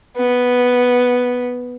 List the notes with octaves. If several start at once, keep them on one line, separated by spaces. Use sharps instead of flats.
B3